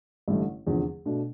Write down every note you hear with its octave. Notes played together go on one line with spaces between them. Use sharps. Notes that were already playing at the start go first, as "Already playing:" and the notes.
A1 G2 D3 A3
F1 E2 D3 F3 C4
B2 A3 D4